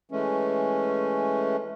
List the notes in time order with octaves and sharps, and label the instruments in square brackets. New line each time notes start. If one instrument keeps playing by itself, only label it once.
[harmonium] E3 G#3 A3 C#4